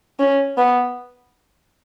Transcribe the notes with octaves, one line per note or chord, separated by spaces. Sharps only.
C#4
B3